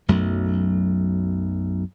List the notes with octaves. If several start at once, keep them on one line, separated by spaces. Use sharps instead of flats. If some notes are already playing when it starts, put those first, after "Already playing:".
B1 F#2 F#3 A3